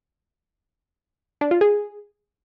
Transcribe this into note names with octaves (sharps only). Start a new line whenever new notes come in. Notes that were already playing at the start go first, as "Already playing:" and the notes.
D4
F4
G#4